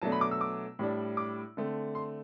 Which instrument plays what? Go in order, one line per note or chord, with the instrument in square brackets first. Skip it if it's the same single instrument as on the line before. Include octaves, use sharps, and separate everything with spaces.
[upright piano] B2 F#3 A3 D4 A5
B5
D6
E6
D6
A2 G3 D4
D6
D3 A3 C4
C6